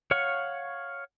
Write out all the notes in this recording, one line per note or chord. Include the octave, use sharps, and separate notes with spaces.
C#5 F5 F#5 C#6